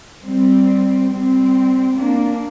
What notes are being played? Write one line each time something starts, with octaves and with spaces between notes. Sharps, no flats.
G3 C4
G3 C4
A#3 D4